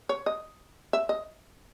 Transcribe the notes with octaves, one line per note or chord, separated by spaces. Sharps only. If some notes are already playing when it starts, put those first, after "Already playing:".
C#5
D#5
E5
D#5